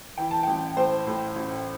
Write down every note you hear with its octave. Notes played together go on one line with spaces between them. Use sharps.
E3 G5
A5
A1 G5
A2 C5
A2
A1